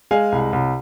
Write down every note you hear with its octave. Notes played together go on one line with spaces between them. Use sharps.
G#3 F5 G#5
C2
C2